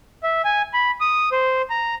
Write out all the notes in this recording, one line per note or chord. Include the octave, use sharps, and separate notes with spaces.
E5
G#5
B5
D#6
C5
A#5